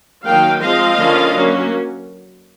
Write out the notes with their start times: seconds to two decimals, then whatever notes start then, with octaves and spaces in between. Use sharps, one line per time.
0.24 D#3 F#3 A#3 F5 G5
0.60 F3 G#3 C4 D#5 F5
0.98 D3 F3 A#3 C#4
1.35 F#3 A#3 C#4